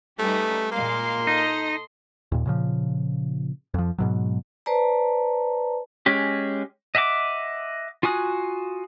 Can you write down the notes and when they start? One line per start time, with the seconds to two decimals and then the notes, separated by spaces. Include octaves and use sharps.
0.19 G3 A3 C#4 D#4 G4 B4
0.72 A#2 G#3 A#3 F5 C6
1.27 D#4 A4 D#5
2.32 D#2 A#2
2.46 A#2 C#3 F3
3.74 F2 F3
3.98 G#2 B2 F#3
4.66 B4 C5 D5 A5 A#5
6.06 G#3 C#4 G4
6.95 D#5 E5 F#5 G#5 D6
8.03 F4 F#4 G#5 D#6 F#6